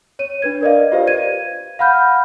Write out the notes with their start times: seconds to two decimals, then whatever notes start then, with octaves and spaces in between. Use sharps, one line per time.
0.19 C#5 D#7
0.42 D4 B4 G#6
0.61 A#4 D5 D#5 F5
0.92 F4 G4 B4 C5 D5 F5
1.07 G#6 D#7
1.79 F5 F#5 B5 F6 G6